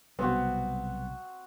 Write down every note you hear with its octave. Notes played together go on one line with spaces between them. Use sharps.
B1 C3 G3 B3 C4 F#4